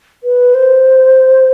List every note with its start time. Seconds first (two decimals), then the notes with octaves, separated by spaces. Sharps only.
0.23 B4
0.54 C5